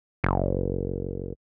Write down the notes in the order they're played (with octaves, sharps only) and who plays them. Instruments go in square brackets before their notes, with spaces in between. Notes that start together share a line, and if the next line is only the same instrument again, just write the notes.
[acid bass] F#1